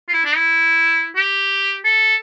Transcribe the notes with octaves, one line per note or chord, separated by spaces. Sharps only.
F4
E4
D4
E4
G4
A4